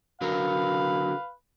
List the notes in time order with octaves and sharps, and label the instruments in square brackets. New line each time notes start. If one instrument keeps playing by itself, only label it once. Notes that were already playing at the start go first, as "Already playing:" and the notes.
[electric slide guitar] D3 F#3 A#4 [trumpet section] B4 F5